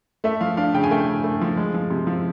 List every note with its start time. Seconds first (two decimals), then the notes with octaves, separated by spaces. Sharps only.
0.24 A3 E5
0.41 F3 F5
0.57 D4 F5
0.74 C#3 G5
0.84 G#5
0.91 A3 G5
1.07 C#3
1.24 A3
1.41 F3
1.57 G#3
1.74 F3
1.90 C3
2.07 F3